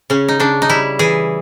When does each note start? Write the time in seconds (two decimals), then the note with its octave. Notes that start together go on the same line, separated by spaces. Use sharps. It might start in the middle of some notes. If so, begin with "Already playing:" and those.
0.10 C#3 C#4
0.28 D#4
0.40 C#3 D4
0.62 D#4
0.69 G3 E4
0.99 E3 G#4